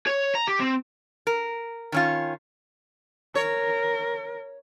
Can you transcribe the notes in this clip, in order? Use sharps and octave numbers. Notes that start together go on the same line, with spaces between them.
C#5
A#5
G4
C4
A#4
D#3 C#4 F4
A#4 C#5